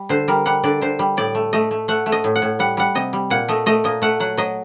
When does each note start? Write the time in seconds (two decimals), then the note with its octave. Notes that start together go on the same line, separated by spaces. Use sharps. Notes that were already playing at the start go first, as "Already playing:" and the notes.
Already playing: G3
0.09 D3 C5
0.28 G3 A#4
0.46 G3 F#5
0.63 D3 D5
0.81 D3 C5
0.99 G3
1.17 A2 D5
1.35 A3
1.53 A3 D#5
1.71 A3
1.88 A3 F#5
2.06 A3
2.12 D#5
2.24 A2
2.36 F#5
2.42 A2
2.59 G3 F#5
2.77 G3 F#5
2.95 C3 D#5
3.13 G3
3.30 A#2 F#5
3.48 A3 D#5
3.66 A3 D#5
3.84 A#2 D#5
4.02 A3 F#5
4.20 F#3 F#5
4.37 F#3 D#5